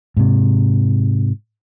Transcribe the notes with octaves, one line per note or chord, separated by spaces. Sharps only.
G#2 C3